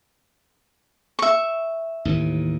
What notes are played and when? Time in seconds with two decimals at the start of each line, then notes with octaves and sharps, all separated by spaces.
1.19 E5 C#6
2.05 D#2 A2 E3